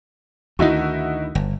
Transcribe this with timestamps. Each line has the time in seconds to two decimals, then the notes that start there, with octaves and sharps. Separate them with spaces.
0.59 D2 D#3 D#4 E4 F#4
1.35 G1